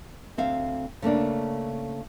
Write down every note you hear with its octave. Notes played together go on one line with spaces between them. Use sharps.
D2 C4 E5 F5
C#3 A3 A#3 D4